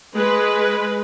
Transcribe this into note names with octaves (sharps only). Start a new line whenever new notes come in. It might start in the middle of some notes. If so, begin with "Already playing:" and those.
G#3 B4